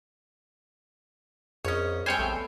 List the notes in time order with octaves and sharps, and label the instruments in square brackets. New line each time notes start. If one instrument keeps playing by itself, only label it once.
[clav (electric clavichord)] A#1 C#4 [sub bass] F2 [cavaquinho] C#5 D#5
[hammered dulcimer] G3 G#3 C4 [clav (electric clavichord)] C5 C#5 [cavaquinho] G5 G#5
[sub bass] A#1 [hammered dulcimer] A3 B3